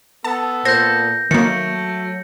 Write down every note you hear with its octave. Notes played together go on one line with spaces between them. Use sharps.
B3 A4 A5
A#2 C5 G6 A#6
D#3 F#3 A3 A#3 C#7